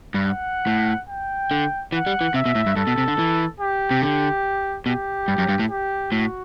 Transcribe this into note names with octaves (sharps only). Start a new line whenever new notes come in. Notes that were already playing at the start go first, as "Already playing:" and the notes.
G2
F#5
A2
G5
D3
E3 F#5
G3
E3
C3 E5
B2
A2
G2
G2 A4
B2
C3
D3
E3
G4
C3
D3 G4
B2 G4
G2
F#2
G2
A2
G4
A2 F#4